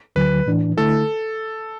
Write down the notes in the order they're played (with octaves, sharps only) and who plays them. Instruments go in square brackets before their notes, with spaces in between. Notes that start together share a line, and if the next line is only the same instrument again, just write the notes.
[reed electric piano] D2 D3 F#3 [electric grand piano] B4
[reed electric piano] A2 E3 D4
[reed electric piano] D3 A3 E4 [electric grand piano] A4